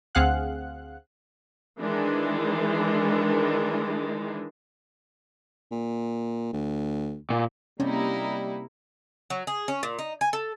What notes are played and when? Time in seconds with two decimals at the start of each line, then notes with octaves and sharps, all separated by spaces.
0.15 D2 C4 G#4 F5 F#5 F#6
1.81 D#3 E3 G#3 D4
5.71 A#2
6.53 D2
7.30 A#2
7.80 C3 G3 A#3 C#4 D#4 E4
9.30 F#3
9.47 G#4
9.68 C#4
9.83 A#2
9.99 D#4
10.21 G#5
10.33 A4